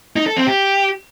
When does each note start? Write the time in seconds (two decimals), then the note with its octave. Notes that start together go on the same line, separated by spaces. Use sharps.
0.16 D#4
0.26 A4
0.37 C4
0.47 G4